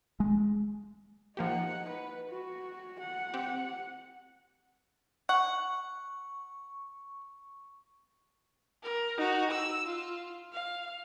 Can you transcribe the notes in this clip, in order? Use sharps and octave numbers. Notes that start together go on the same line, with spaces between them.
G#3
F3 A#3 D#4 G4 F#5
B4
F#4
F#5
C4 G4
F#5 C#6
A#4
D#4 F#4
E6
F4
F5